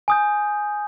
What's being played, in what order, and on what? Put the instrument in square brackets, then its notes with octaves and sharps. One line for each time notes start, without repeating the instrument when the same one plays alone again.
[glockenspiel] G#5 D#6 G6